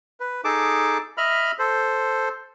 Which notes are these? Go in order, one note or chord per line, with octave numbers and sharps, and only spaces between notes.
B4
D#4 G#4 A4 A5 D6
D#5 E5 B5 F6
A4 C5